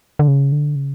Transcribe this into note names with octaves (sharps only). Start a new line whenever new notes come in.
D3
C#3
D3
C#3